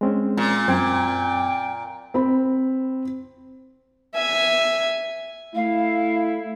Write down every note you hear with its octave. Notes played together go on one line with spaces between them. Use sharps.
G#3 C4 C#4
A#2
F#2 C4 G5 G#6
C4 B5
E5 G#5
A3 E4 F5